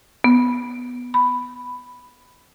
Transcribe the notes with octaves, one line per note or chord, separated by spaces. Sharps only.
B3
B5